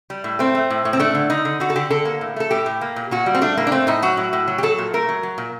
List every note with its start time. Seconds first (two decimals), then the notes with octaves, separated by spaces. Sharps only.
0.10 G3
0.24 A2
0.39 A3 C4
0.55 A3
0.70 A2
0.85 A2
0.93 C4
0.99 A3 D4
1.15 D3
1.30 D3 D#4
1.45 D3
1.60 D3 F#4
1.70 A4
1.76 D3 G4
1.90 D3 A4
2.05 A#3
2.21 A2
2.36 A3 A4
2.51 A2 G4
2.66 A2
2.81 A#3
2.96 A#2
3.11 A#2 F#4
3.26 G3
3.35 C4
3.41 A3 D4
3.57 A2 A#3
3.67 D4
3.72 A3 C4
3.87 A2 D#4
4.02 F#3 F#4
4.17 A2
4.33 A2
4.48 F#3
4.58 G4
4.63 F#3 A4
4.78 A#2
4.93 A3 A#4
5.09 F#3
5.23 F#3
5.38 A#2